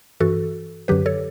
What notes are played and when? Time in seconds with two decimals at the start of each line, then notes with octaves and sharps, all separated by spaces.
0.20 G2 E3 F#4 A4
0.88 F#2 D3 F#3 G4 B4
1.06 A4 C#5